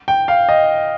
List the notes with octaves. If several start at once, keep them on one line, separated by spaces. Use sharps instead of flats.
G5
F5
D#5